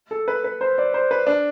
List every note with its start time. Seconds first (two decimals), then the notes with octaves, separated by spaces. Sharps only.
0.11 A4
0.28 B4
0.44 B4
0.61 C5
0.78 D5
0.94 C5
1.11 B4
1.27 D4